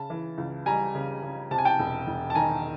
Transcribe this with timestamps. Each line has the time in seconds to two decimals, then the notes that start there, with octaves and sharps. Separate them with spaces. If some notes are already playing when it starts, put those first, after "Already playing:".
Already playing: C#3 A5
0.10 E3
0.38 C#2
0.66 G3 G#5 A#5
0.95 C#3
1.23 C#3
1.51 C3 A5
1.58 G#5
1.65 G5 A5
1.79 E1
2.07 E1
2.30 A5
2.35 D#3 G#5 A#5